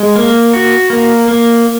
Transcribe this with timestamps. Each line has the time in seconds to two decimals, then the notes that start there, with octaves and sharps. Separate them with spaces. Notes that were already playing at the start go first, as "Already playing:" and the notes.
Already playing: G#3
0.16 A#3
0.53 F#4
0.90 A#3
1.28 A#3